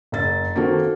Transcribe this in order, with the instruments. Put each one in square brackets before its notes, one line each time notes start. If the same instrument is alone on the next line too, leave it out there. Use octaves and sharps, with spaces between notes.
[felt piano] F#1 A6
D#3 A#3 C4 F#4 A4